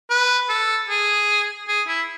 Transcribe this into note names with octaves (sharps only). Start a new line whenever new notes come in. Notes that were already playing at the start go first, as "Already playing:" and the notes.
B4
A4
G#4
G#4
E4